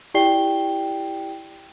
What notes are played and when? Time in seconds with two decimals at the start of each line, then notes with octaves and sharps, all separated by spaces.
0.14 E4 G4 D5 G5 C7 G7